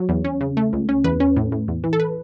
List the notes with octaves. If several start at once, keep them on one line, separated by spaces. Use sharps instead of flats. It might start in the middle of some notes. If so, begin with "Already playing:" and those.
Already playing: F#3 C#5
E2
C#4
C#3
A3
C#2
C#4
E2 B4
C#4
A2
A2
E2
E3
A4
B4